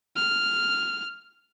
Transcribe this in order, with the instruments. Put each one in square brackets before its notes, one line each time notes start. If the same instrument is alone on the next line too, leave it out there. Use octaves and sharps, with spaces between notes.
[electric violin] F6